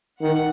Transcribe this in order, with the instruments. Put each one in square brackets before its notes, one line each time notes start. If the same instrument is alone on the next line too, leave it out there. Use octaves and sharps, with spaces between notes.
[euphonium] D#3 [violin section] F#5